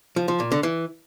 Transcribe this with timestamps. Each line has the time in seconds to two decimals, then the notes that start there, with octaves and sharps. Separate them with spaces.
0.16 F3
0.28 F3
0.40 A#2
0.52 D3
0.63 E3